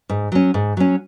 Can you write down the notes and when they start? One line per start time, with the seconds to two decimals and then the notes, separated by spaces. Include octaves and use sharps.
0.09 G#2
0.32 F#3 C#4
0.54 G#2
0.77 F#3 C#4